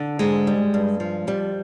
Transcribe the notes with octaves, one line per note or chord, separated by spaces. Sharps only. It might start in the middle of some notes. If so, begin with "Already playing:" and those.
Already playing: D3
G#2 G#3
G3
G2
F3
F2 G3